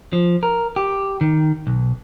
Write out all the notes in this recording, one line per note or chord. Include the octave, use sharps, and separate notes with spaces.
F3
A#4
G4
D#3
B1